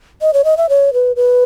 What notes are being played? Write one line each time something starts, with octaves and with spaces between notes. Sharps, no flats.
D#5
C#5
D#5
E5
C#5
B4
B4